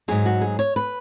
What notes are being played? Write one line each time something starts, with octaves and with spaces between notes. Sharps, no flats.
G#2 F#3 G#4
F#4
G#4
C#5
B4